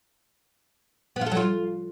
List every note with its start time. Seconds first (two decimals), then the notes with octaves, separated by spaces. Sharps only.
1.16 B3
1.21 F4
1.26 A4
1.32 F#3
1.37 F4